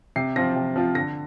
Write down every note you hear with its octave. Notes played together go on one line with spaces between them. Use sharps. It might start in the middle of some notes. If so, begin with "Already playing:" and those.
C3 C7
F3 C4 F4 A#6
C3
F3 C4 F4
D3 A#6